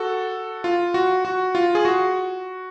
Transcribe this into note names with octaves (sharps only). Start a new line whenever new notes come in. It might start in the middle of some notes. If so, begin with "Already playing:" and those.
Already playing: F#4 A4
F4
F#4
F#4
F4
G#4
F#4